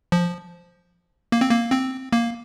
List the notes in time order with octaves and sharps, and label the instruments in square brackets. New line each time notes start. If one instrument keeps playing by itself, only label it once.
[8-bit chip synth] F3
A#3
C4
A#3
C4
A#3